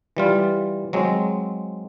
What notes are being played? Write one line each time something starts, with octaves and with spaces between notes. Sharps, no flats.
E3 G3 F4
F#3 G#3 C4